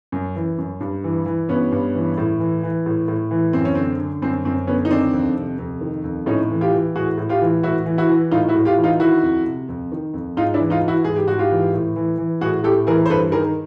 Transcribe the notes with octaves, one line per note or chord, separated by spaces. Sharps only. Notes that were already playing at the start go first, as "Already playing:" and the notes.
F#2
E3
F#2
G2
E3
E3
G2 B3 C#4
G2
E3
A2
E3
E3
A2
A2
E3
F#2 C4
C#4
D3 C4
D3
F#2 C4
F#2 C4
D3 B3 C#4
D#4
D#3 C4 D4
F2
C3
F2
D#3
F2
A2 C#4 D#4
E3
F4 G4
E3
A2 F#4 G#4
A2
F4 G4
E3
A2 E4 F#4
E3
E4 F#4
E3
A2 D#4 F4
E4 F#4
A2
F4 G4
E3
D#4 F4
D#3 E4 F#4
F2
C3
F2
D#3
F2
G#2 D#4 F4
D4 E4
E3
D#4 F4
E3
E4 F#4
G#2 G#4
G4
G#2 F#4
F4 G4
E3
A2
E3
E3
A2 F#4 G#4
A2 G4 A4
E3 G#4 A#4
C5
G2 A4 B4
D#3 G#4 A#4